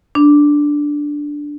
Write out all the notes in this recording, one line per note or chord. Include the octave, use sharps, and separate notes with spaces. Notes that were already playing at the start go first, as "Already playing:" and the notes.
D4